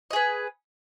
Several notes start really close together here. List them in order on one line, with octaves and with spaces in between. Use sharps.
D#5 G#4 B4